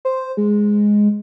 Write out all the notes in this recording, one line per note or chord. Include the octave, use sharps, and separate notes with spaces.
C5
G#3